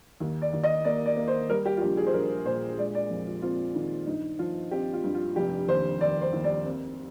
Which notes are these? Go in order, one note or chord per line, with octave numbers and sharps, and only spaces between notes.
D#2
D5
D#2
D#5
A#3 D5
D5
A#3
C5
G3 A#4
G4
F4
A#1 G4
G#4
C5
A#1 A#4
A#2 C5
G#3 D5
D5
F2
F4
C4 F4
D#3
G2 D#4
F3 F4
C4 G4
F4
G2
F4
F1 G4
D#2 C5
D#2 D5
C5
D#2
D5
C4